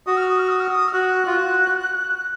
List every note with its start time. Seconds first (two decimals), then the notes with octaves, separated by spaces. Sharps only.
0.06 F#4 D#6
0.17 F6
0.28 D#6
0.39 F6
0.49 D#6
0.60 F6
0.70 D#6
0.88 F6
0.93 F#4 F#6
1.27 F4
1.36 F#4